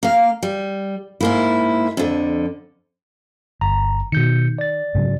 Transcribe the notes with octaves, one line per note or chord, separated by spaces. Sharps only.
A#3 F5
G3
G#2 A#3 E4
F2 D3
G1 A#5
B2 D#3 G6 C#7
D5 A6
G#2 C#3 F#3